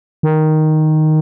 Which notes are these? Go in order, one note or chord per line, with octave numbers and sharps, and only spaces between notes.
D#3